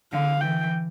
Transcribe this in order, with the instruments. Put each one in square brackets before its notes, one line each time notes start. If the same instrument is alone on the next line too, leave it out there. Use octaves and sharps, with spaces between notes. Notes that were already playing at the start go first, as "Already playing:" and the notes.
[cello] D3 [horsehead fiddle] F5
[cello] E3 [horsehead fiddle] G5